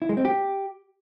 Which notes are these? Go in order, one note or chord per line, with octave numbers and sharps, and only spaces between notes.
E4
G#3
C4
G4